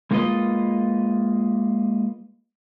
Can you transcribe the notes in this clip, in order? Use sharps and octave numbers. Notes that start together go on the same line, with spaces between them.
G#3 A#3 D#4 F4 B4 D#5